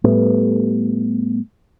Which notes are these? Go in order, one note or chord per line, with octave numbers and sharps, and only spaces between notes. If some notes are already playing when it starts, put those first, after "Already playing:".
A2 G3 A3 B3